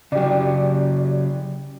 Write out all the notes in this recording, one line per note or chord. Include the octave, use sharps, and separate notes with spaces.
C#3 F#3 G4 D5